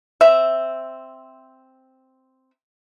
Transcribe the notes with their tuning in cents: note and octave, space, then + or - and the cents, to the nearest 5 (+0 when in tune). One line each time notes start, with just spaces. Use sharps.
C4 +0 E5 +0